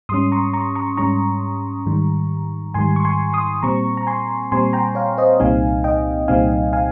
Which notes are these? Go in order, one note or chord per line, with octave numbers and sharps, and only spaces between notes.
G#2 G3 C#4 C6 D#6
A#5 C#6
A#5 C#6
A#5 C#6
G#2 G3 C#4 A#5 C#6
G#2 D#3 G3
G#2 D#3 G3 G#5 C6
C#6
G#5 C6
C6 D#6
A#2 G3 C4 A#5 C#6
A#5
G#5 C6
A#2 G3 C4 G#5 C6
G5 A#5
C#5 F5
C5 D#5
C2 A#2 G3 C4 D#4 F5 G#5
D#5 G5
C2 A#2 G3 C4 D#4 F5 G#5
F5 G#5